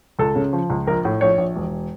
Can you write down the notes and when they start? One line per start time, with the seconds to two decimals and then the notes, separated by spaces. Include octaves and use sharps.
0.19 C#2 A4
0.35 C#3
0.53 F3
0.70 C#2
0.87 A#1 A#4
1.05 A2
1.21 A#1 C#5
1.38 A#1
1.56 E1